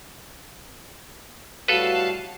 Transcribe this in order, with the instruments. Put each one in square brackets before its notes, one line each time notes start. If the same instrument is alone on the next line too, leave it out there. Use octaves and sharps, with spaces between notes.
[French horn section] A2 G3 F#4 [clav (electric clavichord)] A4 B4 [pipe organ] F5 A5